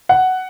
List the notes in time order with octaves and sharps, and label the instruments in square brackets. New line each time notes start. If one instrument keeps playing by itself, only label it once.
[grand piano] F#5